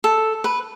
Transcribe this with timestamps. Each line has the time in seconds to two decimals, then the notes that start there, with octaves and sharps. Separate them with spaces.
0.04 A4
0.44 B4